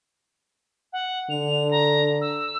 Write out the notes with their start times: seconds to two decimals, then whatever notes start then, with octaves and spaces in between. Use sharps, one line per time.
0.92 F#5
1.30 D3 F7
1.71 A#5
2.21 E6